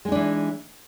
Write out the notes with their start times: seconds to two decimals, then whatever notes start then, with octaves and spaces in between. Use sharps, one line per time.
0.05 G#3
0.08 D#4
0.12 D4
0.15 E3